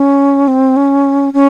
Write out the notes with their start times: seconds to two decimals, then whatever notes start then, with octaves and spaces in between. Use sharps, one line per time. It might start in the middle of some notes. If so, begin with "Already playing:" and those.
Already playing: C#4
0.48 C4
0.77 C#4
1.34 C#4